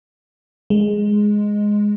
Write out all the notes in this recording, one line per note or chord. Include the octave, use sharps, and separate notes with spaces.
G#3